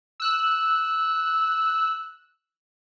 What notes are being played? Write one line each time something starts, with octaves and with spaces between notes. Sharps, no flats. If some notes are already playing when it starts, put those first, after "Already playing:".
E6 F#6